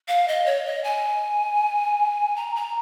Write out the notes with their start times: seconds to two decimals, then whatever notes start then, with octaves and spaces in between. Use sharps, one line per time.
0.08 F5
0.28 D#5
0.46 C#5
0.66 D#5
0.84 G#5
2.36 A#5
2.56 A#5